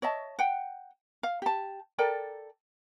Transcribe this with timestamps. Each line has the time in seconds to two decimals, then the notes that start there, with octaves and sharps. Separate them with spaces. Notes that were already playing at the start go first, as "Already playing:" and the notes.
0.02 C#5 D#5 E5 A5
0.39 F#5 G5
1.23 F5
1.42 G4 A5
1.98 A4 A#4 D5 G5